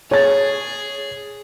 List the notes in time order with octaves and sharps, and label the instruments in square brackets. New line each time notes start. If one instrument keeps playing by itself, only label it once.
[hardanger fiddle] G#4 [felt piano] C#5 A6